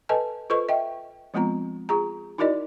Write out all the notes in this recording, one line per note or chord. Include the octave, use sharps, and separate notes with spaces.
A4 B4 D#5 G#5 A5
F4 A4 B4 C5 D#5 C#6
D#5 E5 G5
F3 G#3 B3 C4 F4 A#5
F4 G#4 A#5
D#4 E4 F#4 A#4 D5 D#5